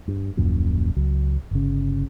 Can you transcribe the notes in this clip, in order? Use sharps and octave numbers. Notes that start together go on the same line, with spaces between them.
G2
D#1 A#1 F#2 A#2
C#2 F#3
G1 C#3